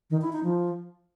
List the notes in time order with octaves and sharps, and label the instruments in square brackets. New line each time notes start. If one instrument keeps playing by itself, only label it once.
[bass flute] D#3
E4
D#4
F3